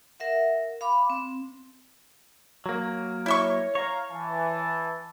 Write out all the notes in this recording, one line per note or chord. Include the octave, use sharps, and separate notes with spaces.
A#4 E5 F#5
F5 B5 D6
C4
F#3 A#3
E4 C#5 E5 C#6
C#5 F5 A#5
E3 A5